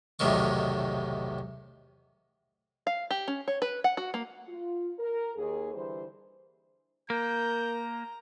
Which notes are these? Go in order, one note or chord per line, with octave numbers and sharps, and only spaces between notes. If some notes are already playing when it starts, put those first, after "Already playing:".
B1 E2 A2 C3 D#3 C#6
F5
G4
C#4
C#5
B4
F#5
F#4
A#3
F4
A#4
D#2 D#3 G#4
D3 E3 G3 E4 C5
A#3 A#4 A#5 G6